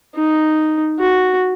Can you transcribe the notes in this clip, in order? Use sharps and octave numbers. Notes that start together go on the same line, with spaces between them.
D#4
F#4